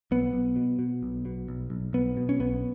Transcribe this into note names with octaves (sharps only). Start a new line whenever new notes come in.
B1 B3
B1
B2
B2
B1
B2
B1
B1
B1 B3
B2
C#4
B1 B3